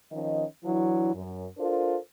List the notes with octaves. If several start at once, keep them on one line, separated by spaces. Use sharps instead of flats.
D#3 F3 C#4 D#5
E3 F#3 D4 E4
F#2
D4 F4 A4 A#4 C5